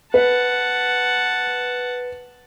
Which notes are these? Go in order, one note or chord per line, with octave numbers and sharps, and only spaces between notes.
B4 F#5 A5